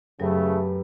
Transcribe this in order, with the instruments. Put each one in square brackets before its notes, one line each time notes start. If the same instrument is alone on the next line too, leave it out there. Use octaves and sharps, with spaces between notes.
[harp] F#2 G4 B4 [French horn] C#3 [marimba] F#3 [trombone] A3